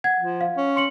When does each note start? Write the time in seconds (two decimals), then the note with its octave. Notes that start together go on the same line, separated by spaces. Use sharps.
0.04 F#5 G#6
0.18 F3
0.41 F5
0.57 C#4
0.76 C6 C#7 F#7